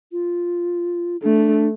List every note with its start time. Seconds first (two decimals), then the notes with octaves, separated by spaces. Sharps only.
0.12 F4
1.23 A3 D4